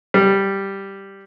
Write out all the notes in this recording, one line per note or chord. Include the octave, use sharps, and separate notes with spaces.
G3